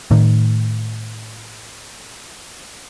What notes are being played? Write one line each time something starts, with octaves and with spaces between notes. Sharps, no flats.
A2 D#3